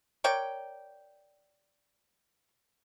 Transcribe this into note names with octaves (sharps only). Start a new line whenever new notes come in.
A#4 C#5 D5 G5